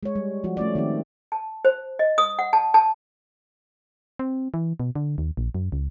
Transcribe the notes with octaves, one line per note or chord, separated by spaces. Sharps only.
G#3 C#5
G3
F3 F#4
A3 C#4 D5
D#3 C4 G4
A5
C5
D#5
D#6
F#5
A5
A5
C4
E3
B2
D3
D#2
A#1
F#2
C#2